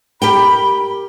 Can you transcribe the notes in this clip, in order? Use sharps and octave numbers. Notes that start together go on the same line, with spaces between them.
G4 A#4 G5 B5